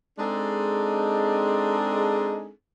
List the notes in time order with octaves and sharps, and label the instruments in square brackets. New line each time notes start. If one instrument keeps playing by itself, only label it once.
[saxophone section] G#3 C4 D4 D#4 G#4 A4